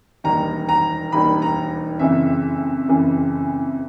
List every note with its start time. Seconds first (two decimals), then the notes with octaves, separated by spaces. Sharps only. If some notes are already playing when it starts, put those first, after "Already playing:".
0.24 E1 D#2 D#3 G3 A#5
0.69 A#5
1.12 E1 D#2 D#3 G3 B5
1.42 A#5
1.99 F#1 F2 C#3 E3 E5
2.88 F#1 F2 C#3 E3